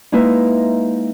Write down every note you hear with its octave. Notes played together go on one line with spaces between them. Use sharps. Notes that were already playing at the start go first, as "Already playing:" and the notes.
G#3 A#3 D#4 E4 B4 E5